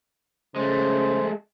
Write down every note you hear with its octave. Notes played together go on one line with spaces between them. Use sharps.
C#3 G#3 A3 C5